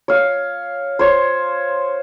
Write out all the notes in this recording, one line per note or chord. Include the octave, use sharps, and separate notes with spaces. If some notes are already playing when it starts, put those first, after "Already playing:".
C#5 F5
C5 C#5